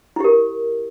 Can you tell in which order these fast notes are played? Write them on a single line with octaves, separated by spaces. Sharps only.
E4 G4 A#4